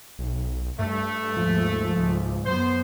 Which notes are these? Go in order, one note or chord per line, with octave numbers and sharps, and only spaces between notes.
B1
G2 A3
D#2 G#2 F3
C#2 G#2
F#2 B3 C5